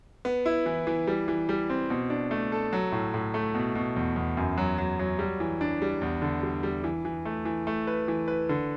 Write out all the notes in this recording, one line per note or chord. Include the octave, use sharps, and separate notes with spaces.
B3
E4
E3
E3
G3
E3
G3
C4
B2
D4
A3
A4
F#3
A2
A2
A3
B2
B2
E2
E2
F#2
F#3
F#3
F#3
G3
E3
D4
G3
E2
D3
G3
G3
E3
E3
A3
E3
A3
B4
E3
B4
D3